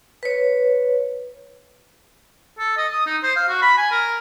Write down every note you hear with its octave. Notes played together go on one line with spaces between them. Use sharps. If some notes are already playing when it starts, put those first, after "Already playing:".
B4 C#5
A4
D#5
D#6
D#4
C5
F5
F#4
B5
G#5
A#4